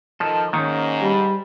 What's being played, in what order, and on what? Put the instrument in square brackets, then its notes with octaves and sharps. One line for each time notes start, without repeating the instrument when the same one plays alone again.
[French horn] D#3 [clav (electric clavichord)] F3 [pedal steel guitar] A4
[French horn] G#2 [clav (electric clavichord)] D#3 [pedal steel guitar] A#3 C#4
[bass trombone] G3